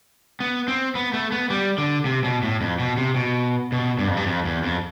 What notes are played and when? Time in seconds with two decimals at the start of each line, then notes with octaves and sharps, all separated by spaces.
0.40 B3
0.68 C4
0.95 B3
1.13 A3
1.32 B3
1.50 G3
1.78 D3
2.05 C3
2.24 B2
2.43 A2
2.61 F2
2.79 B2
2.98 C3
3.16 B2
3.72 B2
3.99 G2
4.08 F2
4.17 G2
4.26 F2
4.45 E2
4.63 F2